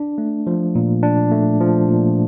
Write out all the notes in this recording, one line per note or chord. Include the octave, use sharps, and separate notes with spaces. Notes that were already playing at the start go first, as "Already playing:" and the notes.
Already playing: D4
A3
F3
A#2
D4
A3
F3
A#2